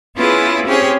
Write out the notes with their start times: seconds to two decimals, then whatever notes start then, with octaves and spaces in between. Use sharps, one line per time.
0.16 B3 C#4 E4 F4 G#4 B4
0.65 C4 C#4 G4 G#4 C5 C#5